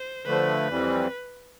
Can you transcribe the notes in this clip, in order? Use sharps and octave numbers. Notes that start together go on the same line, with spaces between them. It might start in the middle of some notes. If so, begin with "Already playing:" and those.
Already playing: C5
D3 F3 A3 B4
F2 E3 G3 C4